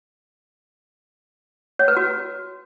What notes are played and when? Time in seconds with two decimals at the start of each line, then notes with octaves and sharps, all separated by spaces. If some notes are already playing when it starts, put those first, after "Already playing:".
1.79 C#5
1.88 B4
1.97 F#4